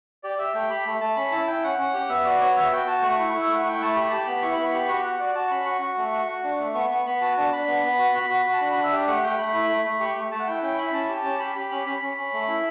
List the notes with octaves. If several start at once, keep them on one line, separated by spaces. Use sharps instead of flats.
G4 D5
G4 E5
A3 G5
G4 B5
A3
A3 A5
C#4 B5
E4 A5
E4 G5
C#4 F#5
C#4
G4
B3 E5
F#4 D5
B3 C#5
F#4 E5
F#4 G5
F#4 A5
A3 C#6
E4
E4
E5
A3
F#5
E4 G5
A3 A5
G4 B5
G4 A5
B3 B5
E4 C#6
B3 B5
C#6
G4 B5
F#4 C#6
F#4 F#5
F#4 D5
F#4 A5
C#6
C#4 B5
F#4 C#6
F#4
A3
F#4
F#4
D4
A3
B3 C#6
B3 C#6
B3 B5
F#4 A5
D4 A5
D4 B5
B3
B3
F#4
F#4
F#4
F#4
A5
D4 B5
D4 B5
E5
G4 D5
A3 F#5
A3 G5
A3 B5
E4
A3
A3
G4 C#6
A3
A3 A5
F#5
E4 G5
C#4 G5
E4 B5
C#4 A5
G4
A5
C#4
G4 B5
G4 B5
C#4 B5
C#4 B5
C#4
C#4
A3
E4